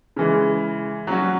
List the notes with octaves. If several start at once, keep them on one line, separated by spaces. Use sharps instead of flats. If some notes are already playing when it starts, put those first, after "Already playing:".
C#3 E3 G#3
F#3 C#4 F#4